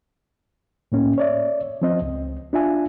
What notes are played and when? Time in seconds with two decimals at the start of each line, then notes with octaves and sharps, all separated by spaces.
0.92 A2 A#3 C#4
1.18 C#5 D5 E5
1.82 F3 C4 D#5
2.02 C#2
2.53 D4 F4 E5 G#5